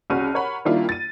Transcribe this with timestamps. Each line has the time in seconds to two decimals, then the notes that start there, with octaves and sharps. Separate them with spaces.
0.10 C2 C#3 C#4 F#4 F6 D#7
0.34 A#4 C#5 F#5 B5
0.65 D#3 G3 A#3 D4 E4 F4
0.89 A6 D#7